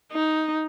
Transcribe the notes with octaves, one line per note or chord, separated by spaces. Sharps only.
D#4